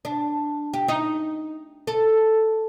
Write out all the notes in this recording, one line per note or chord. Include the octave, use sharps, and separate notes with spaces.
D4
G4
D#4
A4